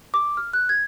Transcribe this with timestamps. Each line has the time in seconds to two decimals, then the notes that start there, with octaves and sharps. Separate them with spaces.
0.14 D6
0.37 F6
0.53 F#6
0.69 G#6